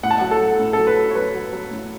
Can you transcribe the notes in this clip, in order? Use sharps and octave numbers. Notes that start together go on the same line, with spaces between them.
A2 F#5
A5
F#5
F#3
A4
F#3
A2
A4
F#3
B4
F#3
C#5
F#3 B4
F#3
F#3
A2